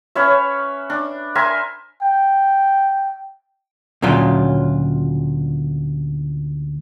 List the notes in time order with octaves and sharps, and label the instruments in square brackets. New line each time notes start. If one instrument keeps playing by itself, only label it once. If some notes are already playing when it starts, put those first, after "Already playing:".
[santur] C#4 B4 C#5 E5
D4
A#4 C5 E5 G#5
[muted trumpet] G5
[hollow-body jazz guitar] D2 A#2 C#3 F#3 F4